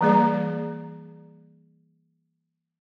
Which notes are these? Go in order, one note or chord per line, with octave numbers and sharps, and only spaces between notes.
E3 G3 A#3 G#4 D5